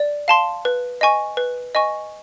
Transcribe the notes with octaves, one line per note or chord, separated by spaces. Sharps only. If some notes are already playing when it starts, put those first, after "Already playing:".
Already playing: D5
F5 A5 C6
B4
D#5 G#5 C#6
B4
D#5 G#5 C#6